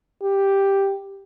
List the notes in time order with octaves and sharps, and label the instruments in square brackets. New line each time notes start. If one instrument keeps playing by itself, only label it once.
[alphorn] G4